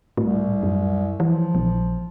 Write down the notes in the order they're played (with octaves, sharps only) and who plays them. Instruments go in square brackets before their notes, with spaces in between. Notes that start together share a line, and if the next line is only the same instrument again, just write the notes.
[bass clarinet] C2 [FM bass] A2
[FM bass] F#2
[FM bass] E3 [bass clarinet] F3
[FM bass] A#1